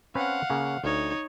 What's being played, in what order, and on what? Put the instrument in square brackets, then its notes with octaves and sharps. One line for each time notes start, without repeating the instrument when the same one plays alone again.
[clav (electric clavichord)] C4 C#4 B4 [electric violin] F5 F#5
[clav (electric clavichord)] C#3 A#3 C#4
[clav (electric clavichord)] D2 [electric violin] D#4 C#5